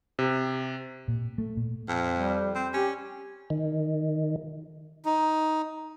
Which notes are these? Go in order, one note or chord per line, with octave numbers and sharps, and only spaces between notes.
C3
A#2
A3
A#2
F2
G3
C4
C#4 G4
D#3
D#4